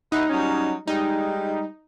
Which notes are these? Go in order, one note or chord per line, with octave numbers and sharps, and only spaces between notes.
D#2 D#4 E4 F#5
F#3 G3 C#4
G3 G#3 D#4